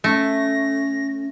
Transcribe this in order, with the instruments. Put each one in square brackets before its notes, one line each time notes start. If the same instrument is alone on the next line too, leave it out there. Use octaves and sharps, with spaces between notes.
[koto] A3 [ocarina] C#4 [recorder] A#6